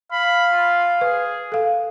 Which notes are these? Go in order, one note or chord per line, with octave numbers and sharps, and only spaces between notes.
F5 B5
F4
G#4 B4
A4 F5